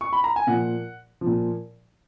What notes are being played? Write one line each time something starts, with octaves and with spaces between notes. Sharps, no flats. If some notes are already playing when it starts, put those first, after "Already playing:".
C#6
B5
A#5
G#5
A#2 F3 F#5
F3
A#2